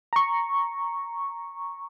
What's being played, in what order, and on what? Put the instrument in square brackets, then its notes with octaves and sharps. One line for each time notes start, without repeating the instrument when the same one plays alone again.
[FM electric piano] A#5 C#6